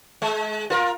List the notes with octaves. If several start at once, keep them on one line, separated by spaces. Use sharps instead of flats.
G#3
F4 A#4